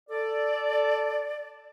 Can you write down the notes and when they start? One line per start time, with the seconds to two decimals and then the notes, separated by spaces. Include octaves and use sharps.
0.10 A4 D5